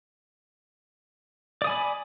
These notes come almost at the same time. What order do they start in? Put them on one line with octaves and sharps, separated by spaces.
D5 D#6 G#5 B5